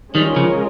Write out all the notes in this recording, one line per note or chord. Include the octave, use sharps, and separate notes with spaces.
D#3 G3 G#3 C#4 F4 A#4
C#3 F3